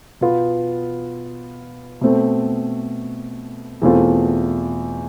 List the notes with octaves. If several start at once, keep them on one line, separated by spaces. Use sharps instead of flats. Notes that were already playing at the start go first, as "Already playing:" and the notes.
B2 B3 F4
B2 A3 C4
E2 B2 A3 C4 F4